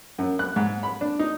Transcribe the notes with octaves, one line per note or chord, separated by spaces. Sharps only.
F#2
F#6
G#2
B5
D4
D#4